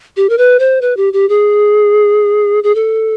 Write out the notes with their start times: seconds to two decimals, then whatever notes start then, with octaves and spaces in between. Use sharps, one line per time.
0.17 G4
0.29 A#4
0.38 B4
0.59 C5
0.82 B4
0.97 G4
1.13 G4
1.29 G#4
2.64 G#4
2.75 A4